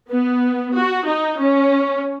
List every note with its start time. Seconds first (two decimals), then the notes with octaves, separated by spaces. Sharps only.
0.11 B3
0.75 F#4
1.07 D#4
1.40 C#4